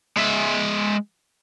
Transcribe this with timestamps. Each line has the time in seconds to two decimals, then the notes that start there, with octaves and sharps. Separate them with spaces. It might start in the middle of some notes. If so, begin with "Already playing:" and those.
0.17 G#3 E5